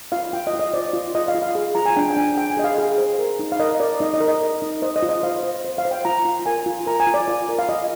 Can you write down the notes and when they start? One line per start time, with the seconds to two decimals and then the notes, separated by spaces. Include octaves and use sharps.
0.12 F4 F5
0.33 F4 G5
0.47 D#5
0.53 F4
0.59 D#5
0.74 C5 D5
0.93 F4
1.15 F4 D#5
1.28 F5
1.35 F4
1.42 F5
1.55 G#4
1.75 F4 A#5
1.86 G#5
1.96 D4 G5
2.11 G5
2.17 D4 G#5
2.37 G#4 G5
2.50 G#5
2.57 G#4 D#5
2.64 F5
2.78 G#4
2.98 C5
3.19 A#4
3.39 D#4
3.52 F5
3.59 A#4 D#5
3.80 A#4 D5
4.00 D#4 D#5
4.14 D#5
4.20 A#4
4.28 D#5
4.41 A#4
4.62 D#4
4.82 C5 D#5
4.96 D#5
5.03 F4
5.09 D#5
5.23 C5 F5
5.43 C5
5.65 C5
5.78 F5
5.85 C5
5.91 G5
6.05 F4 A#5
6.25 F4
6.46 A#4 G#5
6.66 F4
6.87 A#4 A#5
7.00 G#5
7.07 F4
7.14 D5
7.28 F4
7.49 A#4
7.59 F5
7.69 F4 D#5